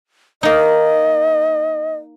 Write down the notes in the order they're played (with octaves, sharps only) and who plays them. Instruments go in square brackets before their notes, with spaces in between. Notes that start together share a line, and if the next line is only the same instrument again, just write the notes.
[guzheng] A#3 D#4 [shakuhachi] D#5